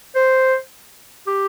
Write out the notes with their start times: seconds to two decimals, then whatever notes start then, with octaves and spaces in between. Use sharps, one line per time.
0.16 C5
1.27 G4